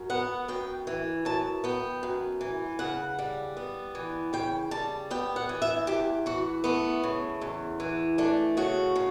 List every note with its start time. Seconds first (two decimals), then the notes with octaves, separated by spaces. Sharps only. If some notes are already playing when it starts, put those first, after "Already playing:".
Already playing: F#2
0.10 B3 F#5
0.48 F#2 G5
0.87 E3
1.25 F#2 A5
1.64 B3 G5
2.03 F#2
2.41 E3
2.79 C#3 F#5
3.19 G3
3.57 B3
3.95 E3
4.33 C#3 G5
4.71 G3 A5
5.10 B3 G5
5.36 F#5
5.49 E3
5.62 E5
5.87 E2 G4
6.26 E3 F#4
6.64 A3 B3
7.03 C#3
7.41 E2
7.80 E3
8.18 A3 D4
8.57 C#3 F#4
8.96 C#3